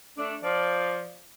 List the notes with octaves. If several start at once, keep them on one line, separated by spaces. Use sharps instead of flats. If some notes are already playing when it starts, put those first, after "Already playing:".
A3 D4
F3 D5